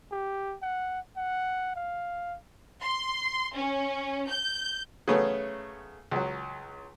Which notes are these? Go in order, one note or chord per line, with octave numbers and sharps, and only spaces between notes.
G4
F#5
F#5
F5
C6
C#4
G6
C#3 F#3 A3 B3 C#4
C#2 F#3